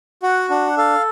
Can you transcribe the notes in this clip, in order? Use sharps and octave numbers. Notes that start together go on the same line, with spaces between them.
F#4 F#5
D4 F#5
A4 F5